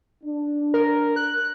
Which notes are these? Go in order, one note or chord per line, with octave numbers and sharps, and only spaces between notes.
D4
A#4
F#6